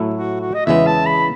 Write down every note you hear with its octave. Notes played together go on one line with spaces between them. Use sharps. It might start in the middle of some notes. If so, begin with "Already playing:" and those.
Already playing: A2 F#3 A3 E4
F#4
F#4
D#5
E2 C#3 G#3 B3 E5
A5
B5